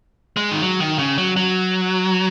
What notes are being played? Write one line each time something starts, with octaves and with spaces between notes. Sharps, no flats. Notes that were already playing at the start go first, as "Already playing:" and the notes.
G#3
D#3
F#3
D#3
C#3
F#3
F#3